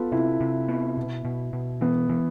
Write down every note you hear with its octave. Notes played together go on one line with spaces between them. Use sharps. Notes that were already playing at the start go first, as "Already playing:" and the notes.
Already playing: B3 F4 A4 B4
C3 E4
C3
B3
B2
B2
B2
E3 B3
E3